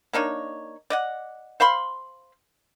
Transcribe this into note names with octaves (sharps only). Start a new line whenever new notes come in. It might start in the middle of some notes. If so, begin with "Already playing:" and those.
A#3 D4 D#4 C#5
D5 D#5 F#5
C5 F5 B5 C6